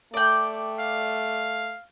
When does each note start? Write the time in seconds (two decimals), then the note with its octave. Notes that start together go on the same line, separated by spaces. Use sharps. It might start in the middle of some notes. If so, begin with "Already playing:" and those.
0.14 A3 D5 G5
0.80 F5